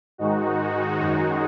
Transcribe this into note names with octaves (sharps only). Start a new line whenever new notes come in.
G#2 D#3 G#3 D#4 F#4
F#2 D#3 G#3